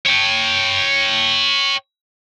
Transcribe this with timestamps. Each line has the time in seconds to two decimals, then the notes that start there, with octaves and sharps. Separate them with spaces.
0.07 C#5 G5